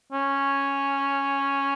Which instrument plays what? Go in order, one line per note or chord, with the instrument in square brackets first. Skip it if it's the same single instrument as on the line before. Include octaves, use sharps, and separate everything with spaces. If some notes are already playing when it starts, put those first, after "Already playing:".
[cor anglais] C#4